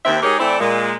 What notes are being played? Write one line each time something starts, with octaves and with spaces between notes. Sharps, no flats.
D#2 C4 E5
G#3 D#4 G4 G#4 A#4 C#5
E3 A3 C4 E4 D5
A#2 G#3